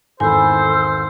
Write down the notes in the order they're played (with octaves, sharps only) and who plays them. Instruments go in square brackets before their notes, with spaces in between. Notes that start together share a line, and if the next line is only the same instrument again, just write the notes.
[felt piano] G#1 E2 [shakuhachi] A4 [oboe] C5 [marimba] G#5 B5